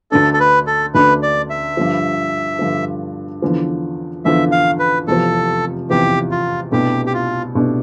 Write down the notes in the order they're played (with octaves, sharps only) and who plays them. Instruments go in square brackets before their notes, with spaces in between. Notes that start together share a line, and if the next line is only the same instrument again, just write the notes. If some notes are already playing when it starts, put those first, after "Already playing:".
[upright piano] D2 D3 A3 D4 [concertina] A4
[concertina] A4
B4
A4
[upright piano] D2 D3 A3 D4 [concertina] B4
[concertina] D5
E5
[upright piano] G2 D3 F3
G2 D3 F3
E2 D3 F3
[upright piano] E2 D3 F3 [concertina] E5
[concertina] F5
B4
[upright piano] F1 E2 C3 F3 [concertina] A4
[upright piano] F1 E2 C3 F3 [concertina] G4
[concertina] F4
[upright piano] C2 B2 A3 D4 [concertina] G4
[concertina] G4
F4
[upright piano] C2 B2 A3 D4